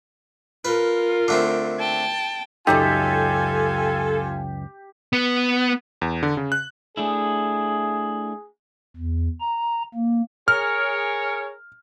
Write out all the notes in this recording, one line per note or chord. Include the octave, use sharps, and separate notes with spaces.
F4 A#4 B4
D3 A3 C4
G5 A5
C#2 F#2 D#4 F4 G4 A4 F5 G#5
B3
E2
D3
C#3
F#6
A3 D4 E4 G#4
E2
A#5
A#3
G#4 A#4 C#5 F6